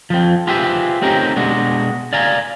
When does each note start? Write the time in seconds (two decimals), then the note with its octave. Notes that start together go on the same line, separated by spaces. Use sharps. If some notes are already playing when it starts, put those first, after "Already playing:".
0.10 F3 C4
0.47 F4 G4 G#4 B4 C5 E5
1.02 A3 C4 C#4 D#4 G4 A#4
1.36 B2 G#3 D4 F#4
2.13 D5 D#5 F5 G#5 A#5